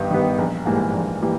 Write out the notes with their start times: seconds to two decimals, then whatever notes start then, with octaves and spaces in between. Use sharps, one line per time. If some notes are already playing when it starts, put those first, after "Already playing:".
Already playing: G2 D#3 G3 B3
0.11 D#3 G3 B3
0.38 A#1
0.66 G#2 E3 G3 A#3
0.93 A#1
1.22 E3 G3 A#3